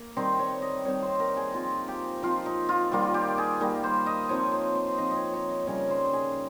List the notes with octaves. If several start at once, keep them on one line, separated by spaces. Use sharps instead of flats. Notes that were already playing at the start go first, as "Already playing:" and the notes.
Already playing: A#3
D#3 G3 C4 D#4 C5
C#5
D#5
D#3 G3 C4 D#4 C#5
C5
A#4
G#4
F3 C4 D#4 F4
G4
F3 C4 D#4 F4
D#4
F4
D#3 G3 A#3 F4
G4
G#4
D#3 G3 A#3
C5
D#5
F3 C4 D#4 C#5
C5
C5
F3 C4 D#4 D#5
C#5 D#5
C#5
D#5
C#3 G3 A#3 C#4 C#5
C5
G#4